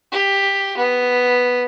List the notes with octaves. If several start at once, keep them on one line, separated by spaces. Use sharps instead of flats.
G4
B3